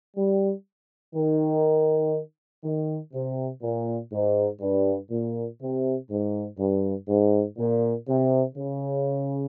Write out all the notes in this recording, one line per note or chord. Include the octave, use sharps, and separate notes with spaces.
G3
D#3
D#3
C3
A#2
G#2
G2
A#2
C3
G#2
G2
G#2
A#2
C3
C#3